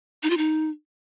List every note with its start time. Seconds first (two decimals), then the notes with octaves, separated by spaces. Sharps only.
0.23 D#4
0.30 F4
0.37 D#4